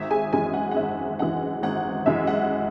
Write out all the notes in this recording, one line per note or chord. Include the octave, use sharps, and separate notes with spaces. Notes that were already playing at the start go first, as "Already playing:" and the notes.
Already playing: G#1 E5
G#4 G#5
F#2 E3 G#3 G#4 G#5
F#5
F#5
G#1 E5
F#2 E3 G#3 F#5
G#1 F#5
F#2 E3 G#3 E5
F#5